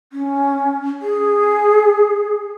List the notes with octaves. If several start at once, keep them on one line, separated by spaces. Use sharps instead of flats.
C#4
G#4